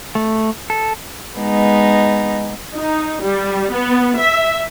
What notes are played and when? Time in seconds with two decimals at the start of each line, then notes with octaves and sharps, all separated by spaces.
0.15 A3
0.70 A4
1.37 G#3 B3 D#4
2.75 D#4
3.21 G3
3.72 B3
4.17 E5